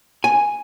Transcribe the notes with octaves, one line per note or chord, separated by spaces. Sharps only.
G#5